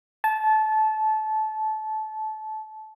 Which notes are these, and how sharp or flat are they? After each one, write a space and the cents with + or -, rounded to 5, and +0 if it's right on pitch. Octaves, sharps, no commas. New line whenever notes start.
A5 -20